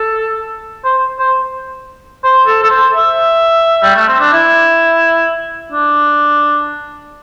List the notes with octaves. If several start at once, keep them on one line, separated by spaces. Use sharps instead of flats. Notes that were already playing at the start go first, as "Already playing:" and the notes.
Already playing: A4
C5
C5
C5
A4
A4
C5
E5
G3
A3
C4
D4
E4
D4